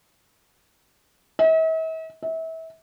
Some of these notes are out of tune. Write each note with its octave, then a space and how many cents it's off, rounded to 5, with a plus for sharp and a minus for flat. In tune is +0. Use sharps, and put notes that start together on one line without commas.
E5 -45
E5 -30